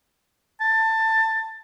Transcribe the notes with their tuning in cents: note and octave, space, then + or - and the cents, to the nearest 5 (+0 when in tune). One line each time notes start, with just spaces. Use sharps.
A5 +20